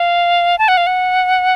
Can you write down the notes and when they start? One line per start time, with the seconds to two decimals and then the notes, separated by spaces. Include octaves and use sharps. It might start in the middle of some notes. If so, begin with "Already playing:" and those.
Already playing: F5
0.58 A5
0.68 F#5
0.77 F5
0.87 F#5